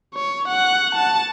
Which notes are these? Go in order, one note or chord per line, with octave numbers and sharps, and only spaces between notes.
C#5
F#5
A5